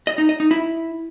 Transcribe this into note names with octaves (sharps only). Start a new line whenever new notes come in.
D#5
D#4
D#5
D#4
E4